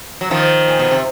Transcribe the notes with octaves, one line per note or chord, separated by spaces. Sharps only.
F#3
D#3 F3
A#2
B2
C3